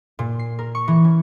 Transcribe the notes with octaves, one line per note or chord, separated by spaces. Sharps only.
A#2
C7
A#4
C#6
E3
C#4